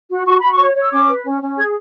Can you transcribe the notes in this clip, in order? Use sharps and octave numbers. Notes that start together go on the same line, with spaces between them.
F#4
F#4 C#6
F#4 B5
C#6
C#5
C#5
E6
C#4 D6
B4
C#4
C#4
G#4 G#6